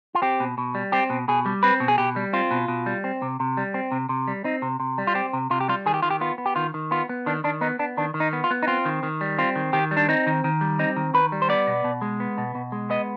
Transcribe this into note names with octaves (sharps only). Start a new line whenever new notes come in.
F4
C4 G4
B2
B2
G3
C4 G4
B2
B2 G#4
G3
C4 B4
B2
G#4
B2 G4
G3
C4 F4
B2
B2
G3
C4
C3
C3
G3
C4
C3
C3
G3
C4 D#4
C3
C3
G3
F4
C4 G4
C3
C3 F4
G4
G3 F4
D#3 G#4
G4
D#3 F4
G4
B3 F4
B3
G4
D#3 F4
D#3
B3 F4
B3
D#3 D4
D#3 D4
B3 D#4
B3 D4
D#3 D4
D#3
D#4
B3
F4
B3
D#4
C4 F4
D#3
D#3
G3
C4 F4
D#3
D#3 G4
G3
D4
C4 D#4
D#3
D#3
G3
C4 D#4
D#3
D#3 B4
G3
C5
B3 D5
B2
B2
G#3
B3
B2
B2
G#3
B3 D#5